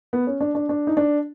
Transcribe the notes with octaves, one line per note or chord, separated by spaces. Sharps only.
B3
C#4
D4
D4
D4
D#4
D4